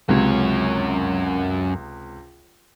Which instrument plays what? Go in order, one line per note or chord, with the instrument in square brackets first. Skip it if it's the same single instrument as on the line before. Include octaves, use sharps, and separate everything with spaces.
[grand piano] C#2 C3 [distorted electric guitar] F#2 C#5